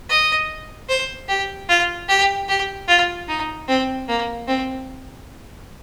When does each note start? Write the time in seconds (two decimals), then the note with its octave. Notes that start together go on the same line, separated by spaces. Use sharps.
0.09 D#5
0.89 C5
1.28 G4
1.69 F4
2.08 G4
2.48 G4
2.88 F4
3.28 D#4
3.68 C4
4.08 A#3
4.48 C4